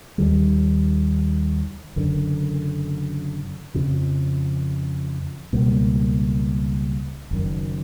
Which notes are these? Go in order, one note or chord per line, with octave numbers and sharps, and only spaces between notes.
D#2 D#3 G3
F#1 F#2 D3
F2 C#3 F3
C#2 B2 G3 A#3
F#1 F#2 D#3